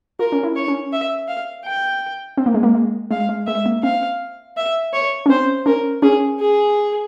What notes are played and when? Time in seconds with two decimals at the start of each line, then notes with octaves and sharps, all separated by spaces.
0.19 F4 A#4
0.32 C#4
0.43 E4
0.56 C#5
0.68 C#4
0.93 E5
1.28 F5
1.65 G5
2.37 C4
2.46 A#3
2.54 G#3
2.63 A#3
2.74 G#3
3.11 G#3 F5
3.29 G#3
3.47 G#3 E5
3.66 A#3
3.83 C4 F5
4.57 E5
4.93 C#5
5.26 C#4
5.29 C4 C5
5.66 C#4 A#4
6.02 C#4 G#4
6.40 G#4